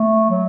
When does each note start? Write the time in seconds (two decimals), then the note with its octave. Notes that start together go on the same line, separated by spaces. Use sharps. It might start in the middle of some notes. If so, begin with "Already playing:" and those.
Already playing: A3
0.30 F#3